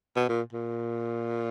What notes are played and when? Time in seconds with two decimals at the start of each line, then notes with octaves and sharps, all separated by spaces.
0.16 B2
0.29 A#2
0.53 A#2